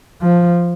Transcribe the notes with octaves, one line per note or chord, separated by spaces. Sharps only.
F3